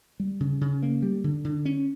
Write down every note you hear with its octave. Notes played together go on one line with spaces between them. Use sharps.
G3
C#3
C#3
A#3
G3
D3
D3
C#4